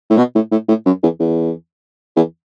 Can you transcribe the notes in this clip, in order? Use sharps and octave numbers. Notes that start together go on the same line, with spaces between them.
A2
B2
A2
A2
A2
F#2
E2
E2
E2